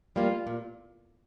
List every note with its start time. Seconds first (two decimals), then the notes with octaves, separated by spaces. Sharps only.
0.16 G3 A#3 F4
0.47 A#2